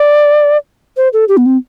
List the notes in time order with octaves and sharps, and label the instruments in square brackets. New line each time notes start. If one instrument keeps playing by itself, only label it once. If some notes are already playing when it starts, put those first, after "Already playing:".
Already playing: [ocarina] D5
C5
A4
G4
B3
C4